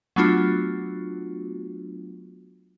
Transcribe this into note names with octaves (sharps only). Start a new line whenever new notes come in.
F#3 A3 B3 D4 F4 F#4